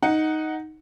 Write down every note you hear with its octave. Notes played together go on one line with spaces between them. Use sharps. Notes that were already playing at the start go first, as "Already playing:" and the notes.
D#4 F#5